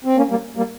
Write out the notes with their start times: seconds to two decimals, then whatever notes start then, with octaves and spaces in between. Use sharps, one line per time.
0.05 C4
0.17 A#3 C#4
0.30 G3 A#3
0.57 G3 A#3